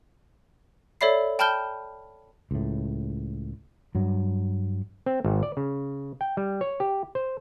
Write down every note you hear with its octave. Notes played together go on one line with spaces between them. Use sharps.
A4 C#5 D5 E5 B5 C7
G5 A5 B5 F6 G6 G7
C#2 A2
G2 F#3
C4
G#1
D5
C#3
G5
G3
C#5
G4
C5